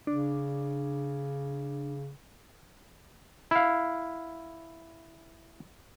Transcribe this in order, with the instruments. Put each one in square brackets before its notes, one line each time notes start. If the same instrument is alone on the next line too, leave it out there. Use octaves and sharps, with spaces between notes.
[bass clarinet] C#3 [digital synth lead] D4
[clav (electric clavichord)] E4 F5